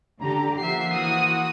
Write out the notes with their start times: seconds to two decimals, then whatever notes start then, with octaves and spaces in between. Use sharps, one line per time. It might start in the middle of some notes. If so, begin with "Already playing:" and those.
0.21 D3 G4 A#5
0.58 F3 A#3 C5 E5 F#5 C7
0.93 E3 F#4 D#6